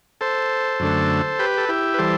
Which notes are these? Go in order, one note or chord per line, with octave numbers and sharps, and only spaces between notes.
A4 C5
F#2 D3 A3
G4 B4
A4
E4 G4
B4
E3 G3 A4 C5